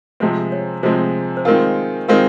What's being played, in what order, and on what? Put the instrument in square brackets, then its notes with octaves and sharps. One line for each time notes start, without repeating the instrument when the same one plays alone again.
[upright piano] C3 F3 G#3 C4 [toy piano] C5
[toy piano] C#5
[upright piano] C3 F3 G#3 C4 [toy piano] C5
[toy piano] C5
[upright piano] D#3 G#3 C4 F4 [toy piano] A#4
[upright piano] D#3 G#3 C4 F4 [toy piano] A#4